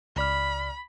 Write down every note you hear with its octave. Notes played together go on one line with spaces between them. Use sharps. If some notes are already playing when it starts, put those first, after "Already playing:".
C#2 D5 B5 F6